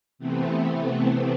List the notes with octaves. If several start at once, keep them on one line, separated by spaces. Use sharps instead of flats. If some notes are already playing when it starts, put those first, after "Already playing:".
C3 E3 A3 B3 C4